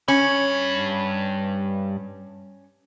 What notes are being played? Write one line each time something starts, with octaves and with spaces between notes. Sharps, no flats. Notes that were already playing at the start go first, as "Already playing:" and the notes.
G2 C#4 B5